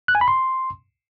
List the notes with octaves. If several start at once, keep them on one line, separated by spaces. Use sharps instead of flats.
F#6
G#5
B5
C6